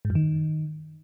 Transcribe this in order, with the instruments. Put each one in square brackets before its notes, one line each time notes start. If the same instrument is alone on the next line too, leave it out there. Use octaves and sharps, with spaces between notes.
[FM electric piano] G#2
F#2
D#3